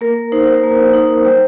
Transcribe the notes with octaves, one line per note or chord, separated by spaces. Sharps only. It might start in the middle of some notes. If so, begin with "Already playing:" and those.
A#3 A#4
D#4 C5
A#4
C5
A#3
D#4
G3 C5